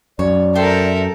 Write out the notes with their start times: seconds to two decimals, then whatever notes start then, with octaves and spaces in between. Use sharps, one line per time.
0.19 F#2 C#5 D5
0.55 A4 A#4 C5 E5 G5